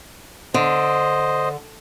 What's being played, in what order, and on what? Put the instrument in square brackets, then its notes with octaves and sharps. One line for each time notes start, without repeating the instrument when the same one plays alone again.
[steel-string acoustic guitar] D3 [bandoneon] C5 D#5